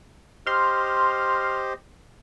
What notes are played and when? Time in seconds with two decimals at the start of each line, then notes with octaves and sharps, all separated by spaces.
0.47 G4 C5 D#5 C6 F6